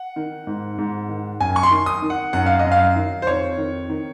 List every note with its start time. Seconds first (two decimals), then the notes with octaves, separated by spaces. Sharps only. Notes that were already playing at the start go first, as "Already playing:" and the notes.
Already playing: F#5
0.16 D#3
0.47 G#2
0.78 G#2
1.09 D#3
1.40 F#2 G#5
1.56 C#6
1.63 C6
1.71 D#3
1.86 D#6
2.02 D#3
2.10 F#5
2.33 F#2 F#5
2.46 F5
2.59 D#5
2.65 F#2
2.72 F5
2.96 D#3
3.22 C5
3.27 F2 C#5
3.58 D#3
3.89 D#3